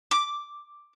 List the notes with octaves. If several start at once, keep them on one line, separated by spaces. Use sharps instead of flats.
D6